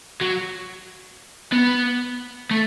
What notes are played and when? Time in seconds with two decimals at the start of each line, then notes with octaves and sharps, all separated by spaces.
0.21 F#3
1.53 B3
2.51 A3